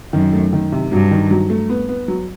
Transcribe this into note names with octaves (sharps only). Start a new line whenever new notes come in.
F#2 D#3
A3
D#3
C3
G2 F#3
D#3
F#3
A3
B3
B3
F#3